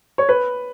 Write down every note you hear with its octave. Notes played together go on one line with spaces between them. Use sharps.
C#5
B4